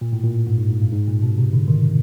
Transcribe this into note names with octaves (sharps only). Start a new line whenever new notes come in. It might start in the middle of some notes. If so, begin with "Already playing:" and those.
A#2
A2
A#2
G#2
G#2
G#2
G2
G#2
A#2
B2
C3
D3
D#3